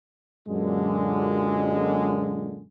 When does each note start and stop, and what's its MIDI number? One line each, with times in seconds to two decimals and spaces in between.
0.48 2.65 42
0.48 2.65 46
0.48 2.65 50
0.48 2.65 56